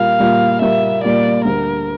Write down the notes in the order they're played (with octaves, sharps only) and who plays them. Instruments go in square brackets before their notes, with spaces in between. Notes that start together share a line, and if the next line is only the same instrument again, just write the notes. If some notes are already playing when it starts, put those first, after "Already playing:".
Already playing: [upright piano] A#2 G3 A#3 F4 [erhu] F5
[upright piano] A#2 G3 A#3 F4
[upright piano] A#2 G3 A#3 F4 [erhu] E5
[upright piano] A#2 G3 A#3 F4 [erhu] D5
[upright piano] D2 D3 G3 [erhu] A#4